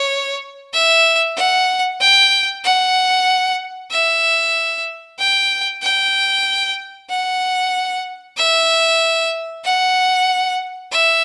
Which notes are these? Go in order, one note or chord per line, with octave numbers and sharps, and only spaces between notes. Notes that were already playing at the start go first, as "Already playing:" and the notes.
Already playing: C#5
E5
F#5
G5
F#5
E5
G5
G5
F#5
E5
F#5
E5